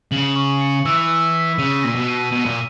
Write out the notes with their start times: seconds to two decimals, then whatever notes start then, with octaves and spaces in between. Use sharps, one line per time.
0.12 C#3 F#7
0.36 C#6
0.61 C#7
0.85 E3 E6
1.10 E6
1.35 B6
1.58 C#3 D#7
1.83 A#2 A#6
1.96 B2
2.08 D#7
2.32 B2 D#7
2.46 A#2